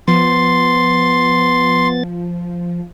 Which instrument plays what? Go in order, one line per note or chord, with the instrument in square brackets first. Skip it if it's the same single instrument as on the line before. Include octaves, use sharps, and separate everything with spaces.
[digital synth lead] F3 [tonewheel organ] B3 A6 [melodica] C6